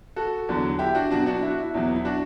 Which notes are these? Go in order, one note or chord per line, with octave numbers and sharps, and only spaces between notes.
F#4 A4
E2 D3 F#3
E4 G4
D4 F#4
B2 F#3 D4 F#4
D4 F#4
E4
F#4
E4
E2 B2 F#3
E4
D4 F#4